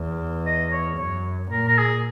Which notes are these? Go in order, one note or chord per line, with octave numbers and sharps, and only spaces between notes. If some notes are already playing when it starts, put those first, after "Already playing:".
Already playing: E2
D#5
C#5
F#2 C#5
A#2 A#4
A#4
G#4